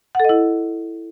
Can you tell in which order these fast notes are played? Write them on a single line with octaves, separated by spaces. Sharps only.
F#5 A4 D#5 E4